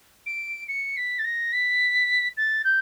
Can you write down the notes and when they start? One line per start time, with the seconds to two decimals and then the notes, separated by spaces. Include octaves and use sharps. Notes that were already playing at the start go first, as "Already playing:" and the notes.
0.26 D7
0.68 C#7
0.96 B6
1.18 A6
1.24 A#6
1.52 B6
2.37 A6
2.64 G6